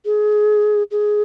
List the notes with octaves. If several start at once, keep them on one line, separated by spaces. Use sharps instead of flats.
G#4
G#4